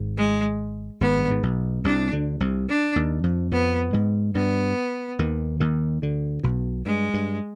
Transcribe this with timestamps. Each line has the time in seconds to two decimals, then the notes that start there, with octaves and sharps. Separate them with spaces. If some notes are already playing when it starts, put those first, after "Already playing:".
Already playing: G#1 G#2
0.17 G#3
1.01 G#1 G#2 B3
1.18 G2
1.30 G#2
1.43 B1 B2
1.84 C2 C3 D4
2.12 D2 D3
2.40 C2 C3
2.69 D4
2.96 D#2 D#3
3.24 F2 F3
3.51 F2 F3 B3
3.93 G#2 G#3
4.35 G2 G3 B3
5.19 D#2 D#3
5.60 D#2 D#3
6.02 D2 D3
6.43 B1 B2
6.86 G2 G#3
7.14 G2